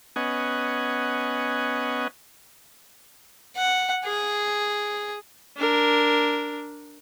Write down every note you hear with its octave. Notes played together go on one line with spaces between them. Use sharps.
B3 C#4 D#5 F#5 G#5
F#5
G#4
D4 A#4